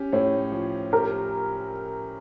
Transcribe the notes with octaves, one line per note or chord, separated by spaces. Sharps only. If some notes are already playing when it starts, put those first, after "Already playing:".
Already playing: C#4 G4
A2 C#5
F3
G4 A#4